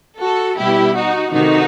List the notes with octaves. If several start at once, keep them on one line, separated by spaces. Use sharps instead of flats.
F#4 A4
B2 G3 B3 E4 G4
D#4 F#4
C3 D#3 A3 D#4 F#4